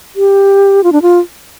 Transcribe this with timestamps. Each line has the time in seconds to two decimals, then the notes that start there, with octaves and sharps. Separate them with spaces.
0.16 G4
0.84 F4
0.92 D4
1.02 F4